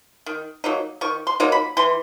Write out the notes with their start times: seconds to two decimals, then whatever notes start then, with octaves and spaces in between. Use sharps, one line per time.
0.26 D#3
0.64 F#3 A#3 D#4
1.01 D#3 C#6
1.27 C6
1.40 F#3 A#3 D#4
1.52 B5
1.77 E3 C6